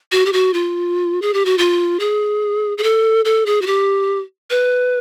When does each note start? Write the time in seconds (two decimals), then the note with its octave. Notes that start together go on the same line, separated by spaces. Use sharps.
0.12 F#4
0.26 G4
0.33 F#4
0.54 F4
1.22 G#4
1.34 G4
1.45 F#4
1.58 F4
2.00 G#4
2.78 G#4
2.83 A4
3.25 A4
3.46 G#4
3.62 F#4
3.67 G4
4.50 B4